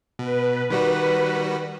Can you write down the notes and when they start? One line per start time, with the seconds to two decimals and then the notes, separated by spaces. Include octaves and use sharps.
0.19 B2 B4
0.70 D#3 G3 F#4